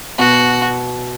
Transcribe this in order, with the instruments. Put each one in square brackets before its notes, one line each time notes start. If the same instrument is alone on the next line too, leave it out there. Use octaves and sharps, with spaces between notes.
[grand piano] B2 [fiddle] F#4